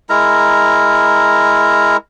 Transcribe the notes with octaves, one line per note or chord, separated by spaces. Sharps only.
G#3 E4 A#4 A#5